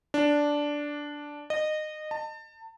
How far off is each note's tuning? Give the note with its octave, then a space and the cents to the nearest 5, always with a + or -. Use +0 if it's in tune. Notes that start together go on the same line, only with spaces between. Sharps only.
D4 -5
D#5 -20
A5 +30